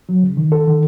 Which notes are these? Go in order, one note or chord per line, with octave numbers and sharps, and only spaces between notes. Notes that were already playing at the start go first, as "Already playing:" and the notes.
F#3
C#3
D#3
A4
D#3